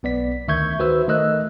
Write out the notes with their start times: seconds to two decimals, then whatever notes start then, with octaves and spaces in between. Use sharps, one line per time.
0.03 B1 B3 D5 B6
0.48 D2 D#3 E5 C#6 G6 G#6
0.79 D#3 F#4 B4 C5 E5 E6
1.08 D#3 A3 A#4 D#5 E6 F#6